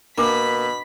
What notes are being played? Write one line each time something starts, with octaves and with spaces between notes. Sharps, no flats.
B2 A#3 D4 B5 D6 B6